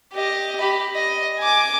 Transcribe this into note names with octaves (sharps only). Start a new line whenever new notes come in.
G4 D#5
G4 B5
D#5
G#5 D6